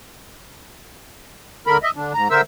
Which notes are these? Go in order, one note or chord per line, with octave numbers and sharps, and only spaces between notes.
D2 D3 A#4 B5
D#5 E5
D3 D4
G#2 A#5
D3 A#4 C5 E5 E6